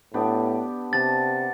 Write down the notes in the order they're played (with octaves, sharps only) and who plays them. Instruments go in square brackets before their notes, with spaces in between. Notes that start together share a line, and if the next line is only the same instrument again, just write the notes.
[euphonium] A2 [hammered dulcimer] B3 D4 G4
[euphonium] C3 [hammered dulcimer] F#5 A5 [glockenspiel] A6